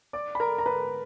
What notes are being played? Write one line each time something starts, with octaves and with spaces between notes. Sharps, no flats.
D5 D6
B5
A#4 A#5
A#5
B4 B5